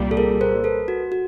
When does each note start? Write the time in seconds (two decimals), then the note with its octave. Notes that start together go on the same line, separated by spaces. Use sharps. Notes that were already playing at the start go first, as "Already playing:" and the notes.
Already playing: C2 A#2 G3
0.11 A4
0.17 G#4 A#4
0.41 A#4 C5
0.64 A4 B4
0.88 F#4
1.12 F#4